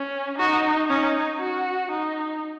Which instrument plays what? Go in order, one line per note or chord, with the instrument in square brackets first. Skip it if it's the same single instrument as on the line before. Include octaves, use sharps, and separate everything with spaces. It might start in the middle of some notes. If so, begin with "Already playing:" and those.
Already playing: [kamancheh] C#4
[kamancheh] D#4 [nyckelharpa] F#4
[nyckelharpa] C#4 [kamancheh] D#4
[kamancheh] F#4
D#4